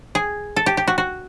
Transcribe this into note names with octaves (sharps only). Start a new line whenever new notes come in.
G#4
A4
G4
G4
F#4
F#4